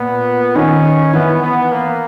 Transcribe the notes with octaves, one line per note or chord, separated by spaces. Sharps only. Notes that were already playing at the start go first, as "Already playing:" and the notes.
Already playing: A#2 A#3 B3
D#3 C#4 D#4
E3 B3 E4
B3
A#3